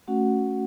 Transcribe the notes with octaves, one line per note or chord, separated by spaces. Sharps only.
A3 C#4 F#4 F#5